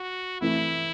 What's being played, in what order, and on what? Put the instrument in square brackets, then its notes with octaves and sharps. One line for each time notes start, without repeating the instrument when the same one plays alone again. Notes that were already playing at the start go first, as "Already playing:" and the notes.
Already playing: [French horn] F#4
[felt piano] E3 A3 C4 [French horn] E4